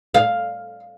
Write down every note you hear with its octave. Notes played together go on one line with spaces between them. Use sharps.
F5